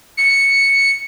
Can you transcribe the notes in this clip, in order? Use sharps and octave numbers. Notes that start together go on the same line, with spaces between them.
C#7